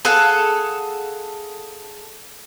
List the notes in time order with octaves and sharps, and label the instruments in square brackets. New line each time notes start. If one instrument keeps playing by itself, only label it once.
[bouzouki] G#4 A4 F5 F#5